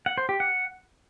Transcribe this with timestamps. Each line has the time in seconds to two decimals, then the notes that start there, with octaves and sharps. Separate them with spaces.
0.06 F#5
0.18 C5
0.29 G4
0.40 F#5